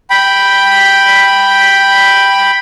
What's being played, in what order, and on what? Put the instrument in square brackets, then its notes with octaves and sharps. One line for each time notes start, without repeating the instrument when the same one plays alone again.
[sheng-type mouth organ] G5 B5